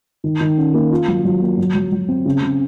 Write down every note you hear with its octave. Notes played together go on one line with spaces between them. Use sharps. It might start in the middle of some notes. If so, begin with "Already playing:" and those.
D#3
D#3
C#4
A#3
F4
F#3
F#3
A#3
F#3
F#3
F#3
C4
C#3
C#3